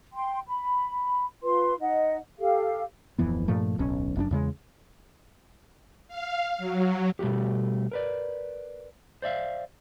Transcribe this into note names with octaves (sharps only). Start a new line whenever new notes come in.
G5 C6
B5
F4 B4 C6
D#4 D#5 F#5
G4 A4 F5
D1 F2 E3 B3
G2 A#2 F3 A3
D1 B1 C#4
F1 F#2 C#4 D4
E2 C#3 G#3
F5
F#3
B2 G3 A3 F#4 G4
A#4 B4 D5
C5 D5 E5 F5